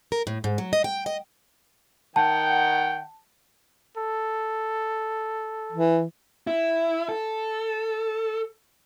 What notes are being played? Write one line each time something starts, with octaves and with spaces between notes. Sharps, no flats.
A#4
A2
G#2
F#3
D#5
G5
D#5
D#3 F#5 G5 A5
A4
E3
E4
A4